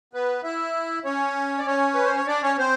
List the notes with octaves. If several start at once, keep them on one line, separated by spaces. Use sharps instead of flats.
B3 B4
E4 E5
C#4 C#5
D5
C#4 C#5
B4
C5
C#5
D4 D5
C#4 C#5
C4 C5